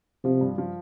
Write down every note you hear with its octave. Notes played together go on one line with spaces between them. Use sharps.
C3 F3
G2
F3